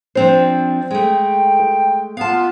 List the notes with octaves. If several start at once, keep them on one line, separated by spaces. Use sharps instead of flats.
F3 C4 D4 C5
G#3 A3 G5
B3 F4 F5 A5